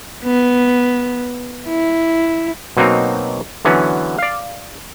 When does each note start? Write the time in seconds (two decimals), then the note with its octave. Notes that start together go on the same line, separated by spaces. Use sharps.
0.24 B3
1.68 E4
2.77 B2 F#3 A#3 C4 D#4
3.65 D3 E3 F#3 B3 C#4
4.18 D5 F5